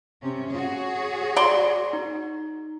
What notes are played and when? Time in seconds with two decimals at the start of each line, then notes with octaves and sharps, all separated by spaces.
0.21 C3 C#4
0.50 F#4 G#4 C#5
1.36 D5 C6
1.93 D#4